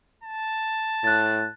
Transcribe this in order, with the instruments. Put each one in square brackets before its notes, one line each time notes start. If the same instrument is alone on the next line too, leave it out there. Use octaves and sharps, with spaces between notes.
[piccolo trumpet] A5
[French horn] A2 [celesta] F#6 A6